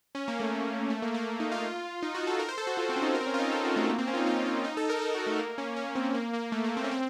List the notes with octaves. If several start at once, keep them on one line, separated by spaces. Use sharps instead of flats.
C#4
A#3
A3
A3
A#3
A#3
D#4
F4
D#4
F#4
A4
A#4
C5
A4
F#4
F4
C4
C#4
D#4
A#4
C4
C#4
F4
D#4
A4
F#4
A3
A#3
C4
C#4
F4
D#4
F4
F4
D#4
A4
A#4
A4
F#4
A3
A#3
C#4
C#4
C4
A#3
A#3
A3
A#3
C4
C#4
C4